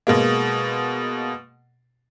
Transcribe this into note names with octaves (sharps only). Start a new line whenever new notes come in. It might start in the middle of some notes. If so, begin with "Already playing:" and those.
B2 G#3 A#3